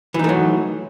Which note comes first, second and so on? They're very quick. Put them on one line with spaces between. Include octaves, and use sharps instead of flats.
E3 D#4 A3 F#3